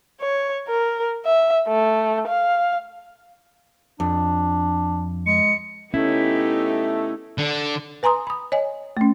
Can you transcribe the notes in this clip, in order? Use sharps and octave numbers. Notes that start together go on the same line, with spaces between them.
C#5
A#4
E5
A3
F5
F2 D4
G#3 C#7
A3 B3 C#4 D#4 E4 G4
D3
B4 G#5 A#5 C6 D#6
B5 D#6
C#5 D#5 G#5
A3 C#4